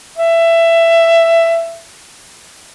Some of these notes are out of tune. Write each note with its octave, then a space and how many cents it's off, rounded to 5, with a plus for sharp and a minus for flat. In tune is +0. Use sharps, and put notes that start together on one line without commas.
E5 +15